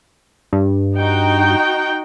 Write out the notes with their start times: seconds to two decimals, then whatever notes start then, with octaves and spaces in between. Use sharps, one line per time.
0.53 G2
0.95 D#4 F#4 G5